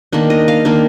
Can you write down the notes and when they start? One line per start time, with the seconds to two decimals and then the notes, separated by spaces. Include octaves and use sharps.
0.12 D#3 A#3 D4
0.30 D#5
0.48 F5
0.65 D#3 A#3 D4